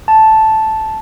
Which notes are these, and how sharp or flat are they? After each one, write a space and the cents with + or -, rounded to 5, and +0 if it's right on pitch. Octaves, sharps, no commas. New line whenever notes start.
A5 -5